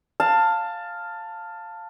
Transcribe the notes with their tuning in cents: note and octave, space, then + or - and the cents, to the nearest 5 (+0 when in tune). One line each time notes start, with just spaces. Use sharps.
F5 +0 A5 +15